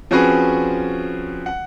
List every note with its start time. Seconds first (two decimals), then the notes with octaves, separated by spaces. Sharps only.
0.11 F3 C4 C#4 F#4 G#4 B4
1.46 F#5